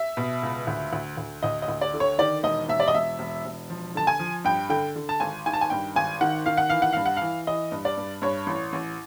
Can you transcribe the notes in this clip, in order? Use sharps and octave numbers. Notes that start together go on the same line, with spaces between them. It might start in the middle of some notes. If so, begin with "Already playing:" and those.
Already playing: E5
B2
C#2
D2
D2
D2
D2 D#5
D#5
D2
D5
D3
C#5
D#3 D5
E1 D#5
E1 E5
D5
D#5
E1 E5
E1
E1
F3
D3 A5
G#5
F3
G2 G5
D3 G5
D3
A5
G#1 G#5
D#3 G#5
A5
G#5
G2 G5
G#1 G#5
D#3 F#5
D#3 F5
F#5
E3 F5
F#5
G2 F5
F#5
E3 F5
E3 D#5
G2
D5
G2
G2 C#5
A1
A1